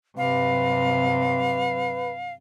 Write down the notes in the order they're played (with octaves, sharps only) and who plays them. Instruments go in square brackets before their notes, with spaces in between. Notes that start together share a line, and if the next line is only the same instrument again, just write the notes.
[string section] G2 C3 F#3 [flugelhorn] B4 [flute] F5